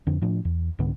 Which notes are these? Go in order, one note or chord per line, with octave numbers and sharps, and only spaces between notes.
F2 D3 C4
A2 F3 D4
E2
C2 G#2 D3 B3